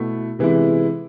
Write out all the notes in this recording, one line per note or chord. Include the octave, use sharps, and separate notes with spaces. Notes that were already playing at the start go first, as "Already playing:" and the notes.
Already playing: B2 A3 E4
C3 E3 G#3 B3 E4